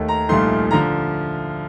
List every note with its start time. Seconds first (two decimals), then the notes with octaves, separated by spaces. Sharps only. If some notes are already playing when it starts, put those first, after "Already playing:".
Already playing: D#2 D#3 A3
0.08 A#5
0.29 C2 A#2 F3 A3 D#4 C6
0.71 D3 F3 A#5